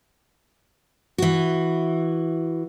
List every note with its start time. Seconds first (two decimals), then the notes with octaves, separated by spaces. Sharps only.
1.18 E3 F#4